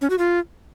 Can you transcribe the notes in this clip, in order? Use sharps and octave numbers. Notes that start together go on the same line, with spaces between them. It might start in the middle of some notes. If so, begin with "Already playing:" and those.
C#4
F#4
F4